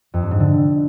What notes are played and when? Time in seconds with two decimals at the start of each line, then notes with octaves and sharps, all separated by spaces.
0.14 F2
0.22 G2
0.31 G#2
0.40 D3